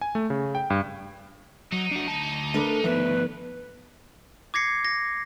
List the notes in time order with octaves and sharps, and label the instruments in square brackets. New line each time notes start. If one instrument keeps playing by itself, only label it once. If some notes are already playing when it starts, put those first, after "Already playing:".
[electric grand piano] G#5
A3
C#3
G5
G2
[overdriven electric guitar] F#3 [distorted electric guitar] D#4
[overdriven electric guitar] D4 F#4
D2 A5
[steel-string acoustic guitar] A3 A#4 B4 [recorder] D4
[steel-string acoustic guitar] D2 D#3 E5 [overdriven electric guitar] F3 B3 [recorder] B4
[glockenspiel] D6 G#6 A#6 C7 C#7
A#6